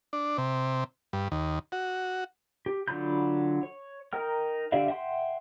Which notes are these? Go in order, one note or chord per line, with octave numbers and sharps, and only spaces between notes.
D4
C3
G2
D#2
F#4
G4
D3 F#3 F4 B5 G6
C#5
D#4 A#4 G5 F6
D3 G4 D5 E5 F5
E5 F#5 G5 C6